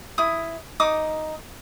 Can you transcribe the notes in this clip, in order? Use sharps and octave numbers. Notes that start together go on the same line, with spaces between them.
E4 D#6
D#4 D6 D#6